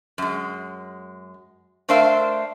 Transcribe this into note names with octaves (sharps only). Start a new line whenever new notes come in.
F#2 G#3
A3 D4 A#4 C5 E5 F5